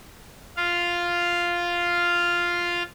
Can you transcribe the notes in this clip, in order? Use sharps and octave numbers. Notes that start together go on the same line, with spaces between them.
F4 F5